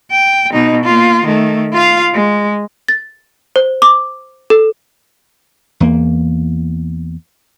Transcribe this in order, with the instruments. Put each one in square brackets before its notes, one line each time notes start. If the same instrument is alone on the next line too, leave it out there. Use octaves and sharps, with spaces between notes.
[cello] G5
B2 D#4
A#3 F4
D#3 A3
F4 F5
G#3
[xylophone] A6
C5
D6
A4
[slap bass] E2 A#3